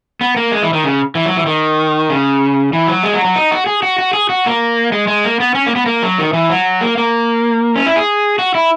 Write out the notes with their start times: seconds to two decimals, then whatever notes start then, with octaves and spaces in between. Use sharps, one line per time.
0.21 B3
0.37 A#3
0.52 G#3
0.63 E3
0.73 D#3
0.84 C#3
1.15 E3
1.26 F#3
1.36 E3
1.46 D#3
2.10 C#3
2.73 E3
2.87 F#3
3.03 G#3
3.14 F#3
3.25 F#3
3.36 D#4
3.51 F#4
3.67 G#4
3.83 F#4
3.99 F#4
4.14 G#4
4.30 F#4
4.46 A#3
4.92 G#3
5.08 G#3
5.24 A#3
5.40 B3
5.55 C#4
5.66 A#3
5.76 B3
5.86 A#3
6.03 F#3
6.18 D#3
6.33 E3
6.50 F#3
6.81 A#3
6.97 A#3
7.76 C#4
7.86 E4
7.96 G#4
8.39 F#4
8.55 E4